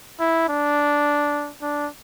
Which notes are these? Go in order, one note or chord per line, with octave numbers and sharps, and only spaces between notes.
E4
D4
D4